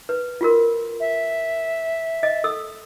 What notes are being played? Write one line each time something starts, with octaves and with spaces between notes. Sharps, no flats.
B4
F4 F#4 A#4
E5
D#5
A4 E6